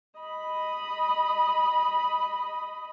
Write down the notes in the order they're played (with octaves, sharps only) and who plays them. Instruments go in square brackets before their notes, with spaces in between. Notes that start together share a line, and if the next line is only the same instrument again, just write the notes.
[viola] D#5 B5